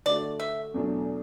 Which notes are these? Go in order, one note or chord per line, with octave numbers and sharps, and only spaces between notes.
D3 A3 F#4 D5
E5
E2 B2 F#3 A3 D4